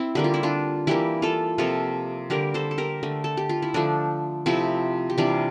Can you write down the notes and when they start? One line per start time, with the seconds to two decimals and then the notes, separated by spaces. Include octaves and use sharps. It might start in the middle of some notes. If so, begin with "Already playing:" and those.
Already playing: C4 E4
0.15 D3 G3 A#3 G4
0.24 F4
0.34 E4
0.43 D4 F4
0.87 E3 G3 A#3 E4 G4
1.22 F4 A4
1.58 C3 F3 A#3 F4 A4
2.30 D3 G3 A#3 G4 A#4
2.54 A4 C5
2.71 A4
2.78 G4 A#4
3.03 D3 A3
3.24 A4
3.37 G4
3.49 F4
3.62 E4
3.74 D3 F3 A3 D4
4.46 C3 F3 A3 C4 E4
5.10 G4
5.18 C3 E3 G3 D4 F4